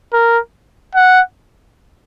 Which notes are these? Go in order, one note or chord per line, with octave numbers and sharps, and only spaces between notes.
A#4
F#5